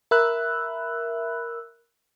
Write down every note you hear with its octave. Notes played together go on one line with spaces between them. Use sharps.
A#4 E5 B5 E6 F#6